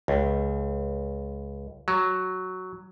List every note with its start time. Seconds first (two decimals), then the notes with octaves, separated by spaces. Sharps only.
0.08 C#2
1.88 F#3